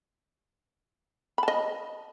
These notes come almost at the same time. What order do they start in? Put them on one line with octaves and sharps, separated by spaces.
B5 A5 D#5